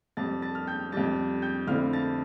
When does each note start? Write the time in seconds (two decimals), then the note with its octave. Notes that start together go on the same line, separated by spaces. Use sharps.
0.17 F2 C3 G3 A5 A6
0.42 A5 A6
0.55 F6
0.67 G5 G6
0.92 F2 C3 G3 A5 A6
1.42 G5 G6
1.67 F2 D3 A3 C4 E4 F5 F6
1.93 A5 A6